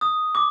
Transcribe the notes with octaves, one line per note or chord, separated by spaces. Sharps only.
D#6
D6